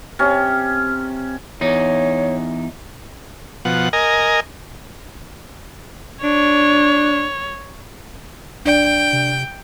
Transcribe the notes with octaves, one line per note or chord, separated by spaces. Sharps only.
C3 C#4
E2 D#4 C#5
B2 F3 F#5
A#4 D#5 G#5
D4 C#5
A#1 D4 D5 G5
C3